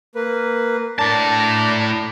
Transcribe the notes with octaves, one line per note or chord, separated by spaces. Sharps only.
A#3 B4
A2 D4 D5 A5 A#5